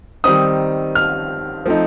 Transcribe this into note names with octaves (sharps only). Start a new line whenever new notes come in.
D#3 G3 C4 D#4 D#6
F6
F3 A3 C4 D#4